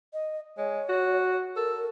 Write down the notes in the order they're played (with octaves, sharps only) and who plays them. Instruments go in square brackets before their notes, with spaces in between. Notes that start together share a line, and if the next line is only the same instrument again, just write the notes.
[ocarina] D#5
[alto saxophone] G#3 [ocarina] C#5
[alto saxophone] F#4
[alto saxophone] A4 [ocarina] A#4